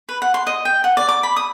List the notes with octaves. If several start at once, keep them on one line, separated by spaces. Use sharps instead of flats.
B4
F#5
C6
D#5
G5
F#5
D5
D6
B5
D#6